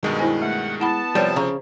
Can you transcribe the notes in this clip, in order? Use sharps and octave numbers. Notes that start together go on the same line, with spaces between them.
G2 B2 D#3 G#3
E4 C5 G#5
A3 F#5
B3 E4 F#5 A5 B5
C3 F3 G3 B4 C#5 G5
C#3 C5 A#5